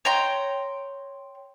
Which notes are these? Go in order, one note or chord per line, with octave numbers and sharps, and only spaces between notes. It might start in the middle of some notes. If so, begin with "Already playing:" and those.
C#5 G5 A#5 C6